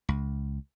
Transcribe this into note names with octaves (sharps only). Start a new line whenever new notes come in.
C#2